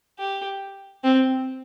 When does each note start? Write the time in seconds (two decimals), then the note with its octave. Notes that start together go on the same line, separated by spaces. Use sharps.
0.19 G4
1.04 C4